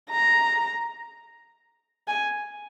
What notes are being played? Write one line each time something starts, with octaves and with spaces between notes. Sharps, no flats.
A#5
G#5